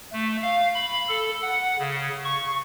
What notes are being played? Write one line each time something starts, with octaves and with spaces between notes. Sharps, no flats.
A3
F5
B5
A4
F#5
C#3
C#6